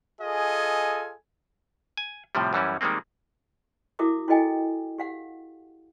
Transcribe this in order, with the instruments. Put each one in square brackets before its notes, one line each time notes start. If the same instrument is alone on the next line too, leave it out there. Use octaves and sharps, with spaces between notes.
[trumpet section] F4 G#4 A4 D#5 G#5
[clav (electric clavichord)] G#5
A2 C3 F3 G3
F#2 E3 G3 C#4
D#3 G3 G#3 A#3 C4
[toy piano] E4 F#4 A#4 E5 D6 D#6
E4 F#4 A4 D#5 G5 G#5
G4 F5 F#5